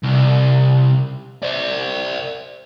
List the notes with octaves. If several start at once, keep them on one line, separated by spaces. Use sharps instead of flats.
C2
C5 D5